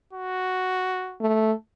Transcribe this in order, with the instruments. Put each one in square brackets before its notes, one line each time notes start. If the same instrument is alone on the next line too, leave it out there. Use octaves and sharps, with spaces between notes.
[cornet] F#4
[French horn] A3